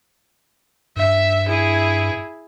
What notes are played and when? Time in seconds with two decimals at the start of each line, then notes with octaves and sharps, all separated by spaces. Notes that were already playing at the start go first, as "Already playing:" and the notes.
0.96 G2 E5
1.47 E4 G#4